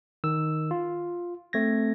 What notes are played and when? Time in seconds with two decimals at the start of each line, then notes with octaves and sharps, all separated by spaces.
0.24 D#3 E6
0.71 F4
1.53 A3 C4 G#6 A#6